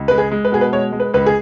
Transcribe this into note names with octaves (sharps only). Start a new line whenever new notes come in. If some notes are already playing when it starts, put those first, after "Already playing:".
Already playing: C#2
G#3 B4
G#4
G#3
B4
B2 G#4
B4
G#3 C#5
G#3
B4
C#2 B4
G#4